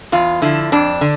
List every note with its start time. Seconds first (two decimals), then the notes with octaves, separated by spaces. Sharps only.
0.12 E2 F4
0.42 D3 F3 E4
0.72 F2 D4
1.01 D3